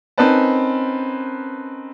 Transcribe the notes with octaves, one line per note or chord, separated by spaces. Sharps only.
C4 C#4 D#4 A#4 B4 A5